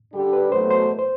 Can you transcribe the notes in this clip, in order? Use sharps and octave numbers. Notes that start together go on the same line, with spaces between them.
D3 G3 D4 G4
B4
E2 B2 F#3 A3 C5
C5
C5